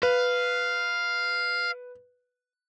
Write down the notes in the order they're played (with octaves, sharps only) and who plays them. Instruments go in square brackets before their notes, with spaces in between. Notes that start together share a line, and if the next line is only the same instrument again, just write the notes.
[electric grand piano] B4 [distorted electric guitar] F5